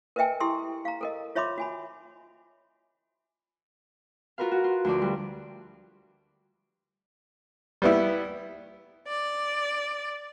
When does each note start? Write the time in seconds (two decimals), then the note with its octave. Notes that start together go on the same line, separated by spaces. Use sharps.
0.16 A#4 B4 D#5 E5 G5 G#5
0.40 E4 G4 A4 C6 E6
0.85 F5 A#5
1.01 A4 A#4 D#5
1.35 F4 C#5 E5 B5 C6 D6
1.58 F#4 G#5 B5
4.38 F4 F#4 A#4 B4 F5
4.51 F#4
4.64 F4
4.85 D2 F3 D5
5.02 G3
7.82 G3 B3 E4
9.08 D5